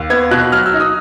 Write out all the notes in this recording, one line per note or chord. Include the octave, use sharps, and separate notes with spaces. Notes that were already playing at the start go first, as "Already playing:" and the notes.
Already playing: D#2
B3 G#6
B2 F#6
F#3 F6
E6
D#4
D#6